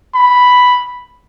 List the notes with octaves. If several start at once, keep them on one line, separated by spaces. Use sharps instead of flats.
B5